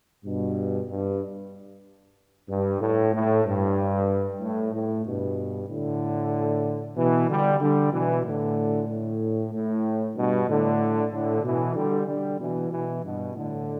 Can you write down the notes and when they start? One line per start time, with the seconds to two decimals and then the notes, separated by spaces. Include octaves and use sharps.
0.25 G2 B2
0.89 G2
2.49 G2
2.81 A2
3.14 A2
3.46 G2
4.41 A2
4.73 A2
5.05 G2 B2
5.69 A2 D3
6.97 B2 E3
7.29 D3 G3
7.61 D3 G3
7.92 B2 E3
8.25 A2 D3
8.88 A2
9.52 A2
10.16 G2 B2
10.48 A2 D3
11.13 A2 D3
11.44 B2 E3
11.76 D3 G3
12.08 D3 G3
12.40 B2 E3
12.72 B2 E3
13.04 G2 B2
13.36 A2 D3